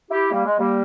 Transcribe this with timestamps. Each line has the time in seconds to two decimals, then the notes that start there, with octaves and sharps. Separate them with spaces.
0.10 E4 G4
0.31 G3 A#3
0.45 G#3
0.59 G3 A#3